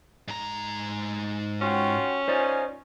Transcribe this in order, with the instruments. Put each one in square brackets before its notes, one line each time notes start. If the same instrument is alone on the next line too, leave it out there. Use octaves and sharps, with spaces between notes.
[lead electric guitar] G#2 A#5
[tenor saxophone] C#4 [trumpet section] F4 F#4 G5
[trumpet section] D#4 F4 G#5 [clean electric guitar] C5 D5